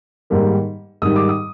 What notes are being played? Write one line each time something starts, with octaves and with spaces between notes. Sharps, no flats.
G#2 D#3 G3 A#3
G#2 D#3 G3 D#6
D6
D#6